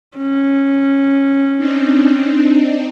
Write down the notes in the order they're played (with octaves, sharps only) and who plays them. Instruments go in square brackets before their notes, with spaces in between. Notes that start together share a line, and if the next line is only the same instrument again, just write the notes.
[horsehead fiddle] C#4
[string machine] C4 D4 D#4